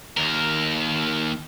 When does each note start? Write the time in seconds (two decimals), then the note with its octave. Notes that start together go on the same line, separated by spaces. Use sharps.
0.17 D#2 A#4